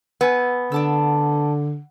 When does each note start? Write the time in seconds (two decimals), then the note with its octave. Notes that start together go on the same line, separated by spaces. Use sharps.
0.21 B3 G#5 E6
0.72 D3 D4 A5 E6